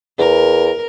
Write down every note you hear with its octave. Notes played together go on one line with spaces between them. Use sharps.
E2 A#4